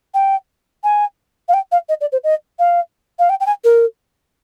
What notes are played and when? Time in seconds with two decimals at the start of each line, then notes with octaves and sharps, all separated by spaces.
0.14 G5
0.84 G#5
1.49 F5
1.54 G5
1.72 F5
1.89 D#5
2.01 D5
2.12 C5
2.24 D#5
2.59 F5
3.19 F5
3.29 G5
3.41 G5
3.46 G#5
3.64 A#4